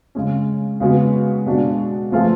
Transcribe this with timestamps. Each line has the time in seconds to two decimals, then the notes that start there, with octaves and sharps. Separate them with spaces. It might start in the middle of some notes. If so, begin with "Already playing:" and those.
0.15 C#3 G#3 C#4
0.80 C#3 G#3 B3 F#4
1.46 B2 G#3 D4 F#4
2.12 F3 A3 F4 G#4 B4